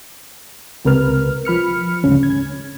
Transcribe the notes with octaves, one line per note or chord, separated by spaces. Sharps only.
C#2 C3 A#4 B4 F6
F3 B5 F6 C#7
D2 G#2 C#3 C#4
G#6